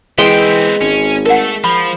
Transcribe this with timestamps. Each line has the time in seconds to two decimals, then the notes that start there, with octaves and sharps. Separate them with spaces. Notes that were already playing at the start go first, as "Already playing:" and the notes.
0.18 E3 G#3 B3 C4 G5 C6
0.81 G#1 C#4
1.26 A3 A4 A#4 F#5
1.64 F3 B5